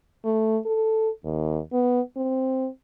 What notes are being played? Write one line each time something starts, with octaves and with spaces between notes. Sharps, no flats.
A3
A4
D#2
B3
C4